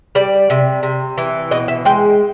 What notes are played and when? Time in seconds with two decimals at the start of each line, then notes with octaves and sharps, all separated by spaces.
0.15 G3 D5
0.50 C3
0.83 C3
1.18 E3
1.51 B2 D#5
1.68 E5
1.85 G#3 G5